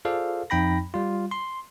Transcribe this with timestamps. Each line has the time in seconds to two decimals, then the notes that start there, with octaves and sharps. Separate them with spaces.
0.05 F4 G#4 A4 C5 D5 F5
0.50 F2 D#4 G5 B5 A#6
0.94 G3 F4
1.31 C6